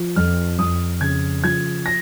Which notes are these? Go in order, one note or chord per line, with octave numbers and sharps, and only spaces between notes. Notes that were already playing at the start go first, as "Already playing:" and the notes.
Already playing: F3
F2 F6
F2 D#6
C#3 G#6
F3 G#6
A#6